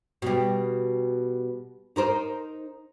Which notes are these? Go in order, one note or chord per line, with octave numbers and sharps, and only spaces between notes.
B2 G3
D#4 A#4 C5